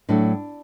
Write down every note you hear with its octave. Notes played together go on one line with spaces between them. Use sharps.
A2 F#3 A3 D4